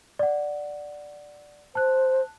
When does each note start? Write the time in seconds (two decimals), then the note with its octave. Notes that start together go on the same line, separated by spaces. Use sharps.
0.19 D5 F#5
1.75 C5 A5 F#6